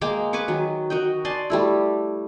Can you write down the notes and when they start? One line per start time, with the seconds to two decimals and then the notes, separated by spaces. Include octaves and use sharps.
0.01 G#3 A#3 G5 D6
0.33 B4 G#5 C#6 D6
0.48 D#3 F#3
0.90 F#4 A#4 D#5 G5
1.25 D5 G#5 A5 C6
1.50 G3 A3 E4